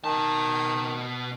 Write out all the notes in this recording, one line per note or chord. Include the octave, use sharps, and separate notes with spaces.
B2 D#3 A5